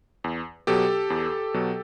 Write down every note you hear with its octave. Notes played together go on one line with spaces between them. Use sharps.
E2
B2 F#3 G4 A4
E2
B2 F#3